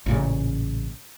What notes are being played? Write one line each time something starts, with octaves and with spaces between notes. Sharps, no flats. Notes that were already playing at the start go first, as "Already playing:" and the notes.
A1 A#2 C#3